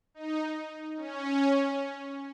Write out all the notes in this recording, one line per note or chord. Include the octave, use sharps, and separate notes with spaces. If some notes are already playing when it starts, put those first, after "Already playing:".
D#4
C#4